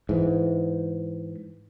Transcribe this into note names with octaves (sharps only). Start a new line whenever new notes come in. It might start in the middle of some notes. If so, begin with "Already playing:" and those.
G#2 E3